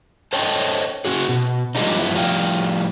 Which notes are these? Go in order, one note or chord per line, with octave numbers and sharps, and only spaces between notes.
A4 C5 C#5 D#5 G5 A5
C#3 F#3 C#4 F#4 G#4
B2
F3 G3 G#3 A#3 D4 D#4
F#2 F3 B3 E4
A2 F3 G3 C#5 F5 G5